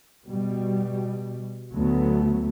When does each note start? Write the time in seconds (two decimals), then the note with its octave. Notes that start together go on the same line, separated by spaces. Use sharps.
0.25 B2 G3
1.73 D2 F#3 A3 B3